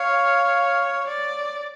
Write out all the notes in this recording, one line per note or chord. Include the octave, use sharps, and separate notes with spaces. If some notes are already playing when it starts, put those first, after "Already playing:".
Already playing: C#5 F5
D5